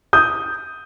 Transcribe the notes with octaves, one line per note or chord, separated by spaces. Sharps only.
D#6 G6